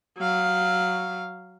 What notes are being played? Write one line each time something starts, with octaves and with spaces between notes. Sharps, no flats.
F#3 F5